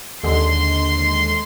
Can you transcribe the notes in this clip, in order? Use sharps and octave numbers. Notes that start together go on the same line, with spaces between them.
D#2 D3 G#3 C6